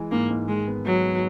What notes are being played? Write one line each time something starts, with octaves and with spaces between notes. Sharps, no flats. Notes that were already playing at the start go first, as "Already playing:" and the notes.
Already playing: E3 G#3
G#2 A#3
G#2
D#3 G#3
B3
F#3 G#3
B3